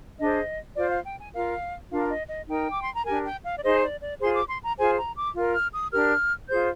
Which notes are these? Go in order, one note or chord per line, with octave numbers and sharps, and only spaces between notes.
D4 G#4 C5 D#5
F4 C5 D5
F5
G5
G#5
F4 A#4 F5
D4 F4 A#4 F5
D#5
D#5
D#4 A#4 G5
D6
C6
A#5
D4 G4 A#4 G#5
G5
F5
D5
D#4 G#4 C5 D#5
D5
D5
F4 G#4 C5 C6
D6
C6
A#5
F4 G#4 C5 G#5
A#5
D6
F4 A#4
F6
D#6
D4 G4 A#4 F6
F4 G#4 C5 G6